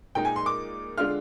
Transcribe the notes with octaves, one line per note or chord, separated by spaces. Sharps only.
A#2 G#3 D#4 G5
G#5
C6
D6
D3 G#3 D4 F4 F6